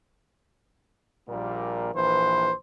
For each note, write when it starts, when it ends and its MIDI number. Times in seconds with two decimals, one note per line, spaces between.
1.29 1.90 34
1.29 1.90 46
1.29 1.90 55
1.29 1.90 58
1.95 2.52 34
1.95 2.52 52
1.95 2.52 71
1.95 2.52 72